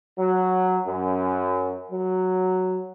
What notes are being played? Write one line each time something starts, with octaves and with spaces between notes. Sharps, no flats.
F#3
F#2
F#3